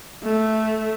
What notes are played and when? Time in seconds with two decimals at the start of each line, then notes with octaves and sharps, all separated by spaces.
0.24 A3